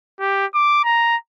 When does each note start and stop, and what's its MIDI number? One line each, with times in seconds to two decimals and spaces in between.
0.20 0.46 67
0.54 0.83 86
0.84 1.16 82